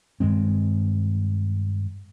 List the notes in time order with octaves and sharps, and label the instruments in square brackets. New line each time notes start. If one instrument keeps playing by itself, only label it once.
[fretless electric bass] G2 D#3 G#3 C4